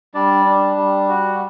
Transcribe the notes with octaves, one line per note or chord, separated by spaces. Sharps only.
G3 D4 D5
D4
G3
F#4